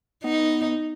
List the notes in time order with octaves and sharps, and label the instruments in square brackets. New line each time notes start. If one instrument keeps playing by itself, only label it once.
[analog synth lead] B3 [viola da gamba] D#4